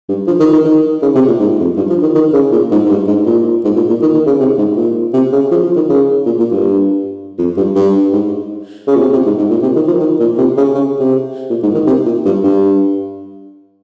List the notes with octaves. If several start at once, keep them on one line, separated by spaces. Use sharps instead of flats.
G2
F3
D#3
D#3
D#3
C#3
C3
A#2
G#2
F2
G2
F3
D#3
D#3
C#3
A#2
G#2
G#2
G2
G#2
A#2
G#2
A#2
A#2
D#3
D#3
C#3
C3
G#2
A#2
C3
C#3
F3
F3
D#3
C#3
A#2
A#2
G2
F2
G2
G2
G#2
C#3
A#2
C3
C3
G#2
G#2
A#2
C3
D#3
F3
D#3
A#2
C3
C#3
C#3
C3
A#2
G#2
D#3
C3
A#2
G2
G2